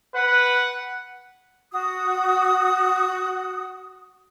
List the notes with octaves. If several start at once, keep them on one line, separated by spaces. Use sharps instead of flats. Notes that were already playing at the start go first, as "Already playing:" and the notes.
B4 F#5
F#4 D#6